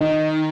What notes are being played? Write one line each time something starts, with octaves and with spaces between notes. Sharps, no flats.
D#3 D#4